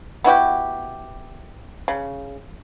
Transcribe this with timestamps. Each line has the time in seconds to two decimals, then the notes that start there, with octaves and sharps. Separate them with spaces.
0.24 B3 E4 F#4 G4
1.88 C#3